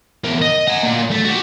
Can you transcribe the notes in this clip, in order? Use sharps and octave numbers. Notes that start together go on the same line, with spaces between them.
E2 A#4
D#5
F#5 G#5
A#2
A3
F#4 G4